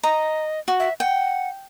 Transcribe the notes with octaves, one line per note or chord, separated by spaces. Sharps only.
D#5 A#5
F#4
E5
F#5 G5